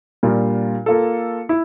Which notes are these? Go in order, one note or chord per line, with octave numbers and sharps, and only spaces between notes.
A#2 G3 D4 F4 A#4
A#3 F4 A4
E4